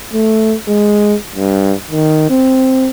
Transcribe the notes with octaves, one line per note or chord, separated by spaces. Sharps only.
A3
G#3
G2
D#3
C4